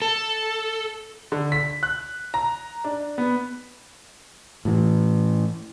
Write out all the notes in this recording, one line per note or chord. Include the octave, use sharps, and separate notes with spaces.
A4
D3
B6
F#6
A#5
D4
B3
A2 E3